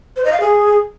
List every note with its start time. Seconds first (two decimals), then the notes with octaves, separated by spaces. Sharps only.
0.16 C5
0.24 D#5
0.32 F5
0.40 G#4